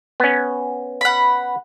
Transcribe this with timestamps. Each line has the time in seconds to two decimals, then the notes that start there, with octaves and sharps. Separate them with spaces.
0.20 B3 C#4
1.01 F#5 B5